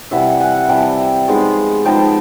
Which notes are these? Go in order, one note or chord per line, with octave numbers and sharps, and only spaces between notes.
C3 E3 G3 E5 F#5
F#5 G#5
C3 E3 G3 G5 A5
F3 G#3 B3 D#4
F3 G#3 B3 D#4 G5 A5